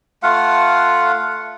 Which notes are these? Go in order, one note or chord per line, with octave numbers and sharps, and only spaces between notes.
A3 F4 F5 F#5